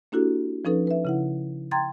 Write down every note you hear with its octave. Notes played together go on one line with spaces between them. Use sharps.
A#3 D4 E4 F#4 G4 A4
F3 C#4 D#4 A4 B4
B4 E5
C#3 E4 F#5
G5 A#5 C6 G#6 A6